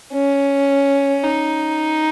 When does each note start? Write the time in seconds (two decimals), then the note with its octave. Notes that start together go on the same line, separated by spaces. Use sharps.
0.13 C#4
1.25 D#4